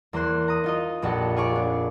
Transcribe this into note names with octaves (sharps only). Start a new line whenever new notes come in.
E2 A#3 C5 C6 F#6 C7
A#5 D#6
D#4 F4 D#5
A#1 F2 F#4 G4 A5 C#7
F4 G#4 C#5 C#6 D6
D4